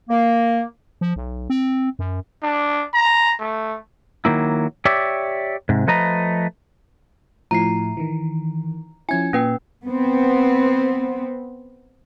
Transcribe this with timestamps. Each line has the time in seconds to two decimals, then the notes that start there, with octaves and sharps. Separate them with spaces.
0.09 A#3
1.01 F3
1.16 B1
1.50 C4
1.99 F#2
2.42 D4
2.93 A#5
3.40 A3
4.25 D#3 F#3 A#3 E4
4.85 G4 C#5 D5 E5
5.69 G#2 C3
5.87 F3 A3 B4 D#5 A#5
7.51 A2 F3 E4 A#5 C7
7.97 D#3 E3
9.09 F3 C#4 E4 G#5 G#6
9.33 A#2 C#4 B4 G5
9.85 B3 C4